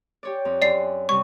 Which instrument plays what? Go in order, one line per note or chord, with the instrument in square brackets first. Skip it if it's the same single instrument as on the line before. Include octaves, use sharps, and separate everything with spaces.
[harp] G4 C#5 D5
F2
[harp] F#2 [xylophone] D5 C7
[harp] C3 G3 [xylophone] C#6